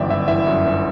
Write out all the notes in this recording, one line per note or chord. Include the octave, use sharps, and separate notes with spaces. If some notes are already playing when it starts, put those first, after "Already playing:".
Already playing: G1 F#2 E3 D5 E5 G5
G1 E5
E3 E5
F#2
G1